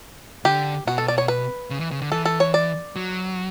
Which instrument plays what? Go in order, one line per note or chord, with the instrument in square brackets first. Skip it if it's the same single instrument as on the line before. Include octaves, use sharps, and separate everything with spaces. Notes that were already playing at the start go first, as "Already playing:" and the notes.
[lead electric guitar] D3 [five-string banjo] G4
[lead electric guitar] B2 [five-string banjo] F#4
[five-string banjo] A4
D5
C#5
B4
[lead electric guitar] C#3
E3
C#3
D3
[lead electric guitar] E3 [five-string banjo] A4
[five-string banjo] A4
C#5
D5
[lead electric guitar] F#3